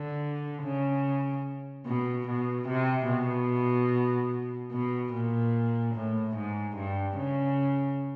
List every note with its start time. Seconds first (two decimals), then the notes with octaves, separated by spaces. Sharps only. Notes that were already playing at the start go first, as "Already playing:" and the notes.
Already playing: D3
0.63 C#3
1.86 B2
2.27 B2
2.68 C3
3.08 B2
4.72 B2
5.13 A#2
5.94 A2
6.35 G#2
6.76 G2
7.17 C#3